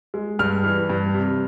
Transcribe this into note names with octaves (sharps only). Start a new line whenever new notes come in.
G#3
G2 F6
E3
G2
C3